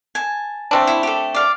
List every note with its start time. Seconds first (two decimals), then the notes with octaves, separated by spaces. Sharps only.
0.15 G#5 A5
0.71 A3 C4 D4
0.87 E4
1.03 G4 A4
1.35 D5 F5